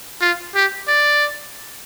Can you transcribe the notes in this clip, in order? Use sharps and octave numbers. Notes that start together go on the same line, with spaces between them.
F4
G4
D5